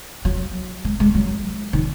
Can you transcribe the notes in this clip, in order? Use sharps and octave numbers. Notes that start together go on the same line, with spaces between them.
F#3
G#3
G#3
F#3
D#3